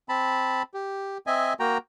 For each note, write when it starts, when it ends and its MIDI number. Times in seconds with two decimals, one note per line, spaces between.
0.09 0.62 60
0.09 0.62 81
0.09 0.62 83
0.74 1.18 67
1.27 1.53 60
1.27 1.53 75
1.27 1.53 76
1.27 1.53 80
1.60 1.78 58
1.60 1.78 66
1.60 1.78 79
1.60 1.78 82